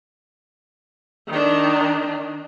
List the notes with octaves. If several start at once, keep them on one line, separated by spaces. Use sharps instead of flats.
D#3 D4